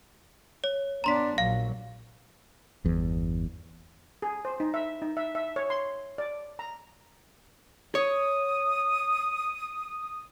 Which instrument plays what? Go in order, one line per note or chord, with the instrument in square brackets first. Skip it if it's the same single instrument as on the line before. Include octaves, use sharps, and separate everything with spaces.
[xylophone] C#5
[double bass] B3 D4 [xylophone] A#5 C6 B6
[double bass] A#1 F#3 [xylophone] F5
[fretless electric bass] G1 E2
[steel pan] G#4
C5
D#4
E5
D#4
E5
E5
C#5
C6
D5
A#5
[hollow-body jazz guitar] C#5 [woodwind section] D#6